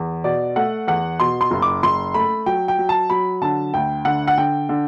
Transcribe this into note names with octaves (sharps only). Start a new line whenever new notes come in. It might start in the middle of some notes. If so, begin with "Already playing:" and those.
Already playing: E2
B2 D5
A3 F#5
E2 F#5
B2 C6
C6
F#1
D6
F#1 C6
A3 B5
F#3 G5
G5
F#3
A5
F#3 B5
D3 A5
D2 G5
D3 F#5
F#5
D3 G5
D3